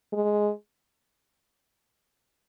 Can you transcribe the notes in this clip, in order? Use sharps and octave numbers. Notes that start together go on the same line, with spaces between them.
G#3